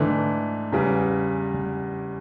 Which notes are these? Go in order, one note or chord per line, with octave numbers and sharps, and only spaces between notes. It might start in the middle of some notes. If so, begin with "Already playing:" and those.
Already playing: G#2 D3 E3 A3 D4
E2 C#3 E3 G3